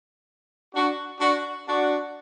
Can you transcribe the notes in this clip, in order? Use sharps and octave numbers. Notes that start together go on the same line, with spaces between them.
D4 F#4
D4 F#4
D4 F#4